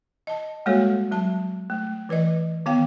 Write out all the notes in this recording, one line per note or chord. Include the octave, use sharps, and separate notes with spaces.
D#5 A5
G3 G#3 A#3 F#4 A4 C#5
F#3 A5
A3
E3 B4 D5 D#5
D#3 B3 F5 G5